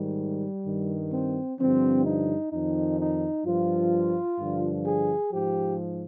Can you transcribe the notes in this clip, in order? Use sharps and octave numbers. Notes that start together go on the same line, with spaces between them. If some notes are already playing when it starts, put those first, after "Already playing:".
Already playing: G#2 D#3 G3
G2 D#3
C4
G2 D3 F3 C4
D#4
F2 D#3 D#4
D#4
G2 F3 F4
G2 D3 F3
G#4
G#2 F3 G4